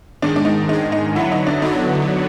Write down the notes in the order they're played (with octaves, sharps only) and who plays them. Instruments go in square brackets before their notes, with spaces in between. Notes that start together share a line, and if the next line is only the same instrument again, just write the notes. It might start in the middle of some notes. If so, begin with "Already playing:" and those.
[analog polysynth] G#2 D#3 G#3 [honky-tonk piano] D4
[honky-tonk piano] D4
D#4
[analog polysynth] G#2 D#3 G#3 [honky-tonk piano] D#4
[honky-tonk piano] D#4
[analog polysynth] D3 F#3 B3 [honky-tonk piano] E4
[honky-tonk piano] D#4
D4
[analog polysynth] D3 F#3 B3 [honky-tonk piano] D#4